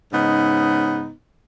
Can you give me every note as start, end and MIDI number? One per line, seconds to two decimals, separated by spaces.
0.13 1.11 44
0.13 1.11 49
0.13 1.11 59
0.13 1.11 63